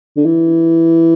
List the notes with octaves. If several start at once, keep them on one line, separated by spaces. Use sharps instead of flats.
D3
E3